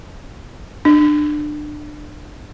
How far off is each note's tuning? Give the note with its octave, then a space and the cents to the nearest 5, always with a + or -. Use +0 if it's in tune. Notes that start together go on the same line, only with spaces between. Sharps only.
D4 +25